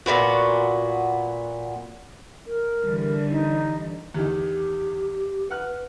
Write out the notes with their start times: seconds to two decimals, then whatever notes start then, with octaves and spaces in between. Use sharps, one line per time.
0.06 A#2 C#3 B3 F#4
2.47 A#4
2.84 D3 E3 G3
3.30 D#4
4.14 E2 D#3 G4
5.50 B4 F#5 F6 F#6